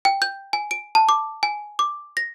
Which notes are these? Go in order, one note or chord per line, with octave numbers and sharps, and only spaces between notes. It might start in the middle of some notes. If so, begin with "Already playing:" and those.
G5
G6
G#5
D7
A5
D6
G#5
D6
A#6